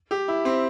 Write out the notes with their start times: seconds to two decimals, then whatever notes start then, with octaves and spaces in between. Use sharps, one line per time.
0.11 G4
0.28 E4
0.45 C4